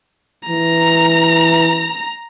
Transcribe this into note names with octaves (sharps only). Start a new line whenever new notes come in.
E3 A#5